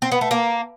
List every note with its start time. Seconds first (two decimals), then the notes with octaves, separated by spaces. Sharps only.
0.02 C4
0.12 B3
0.21 A3
0.31 A#3